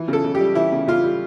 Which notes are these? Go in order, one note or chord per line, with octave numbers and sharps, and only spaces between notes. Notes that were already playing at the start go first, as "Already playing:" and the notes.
Already playing: E3
C#3 A4
C#3
G4
G3
E3 E4
C#3
C#3 F4
G3